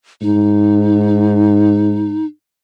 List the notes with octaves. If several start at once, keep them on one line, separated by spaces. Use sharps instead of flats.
G#2 D#4